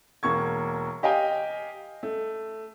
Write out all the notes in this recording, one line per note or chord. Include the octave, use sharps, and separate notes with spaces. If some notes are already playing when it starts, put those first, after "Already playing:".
E1 A#3 C#6 G#6
G4 D#5 F5 G5 G#5
A3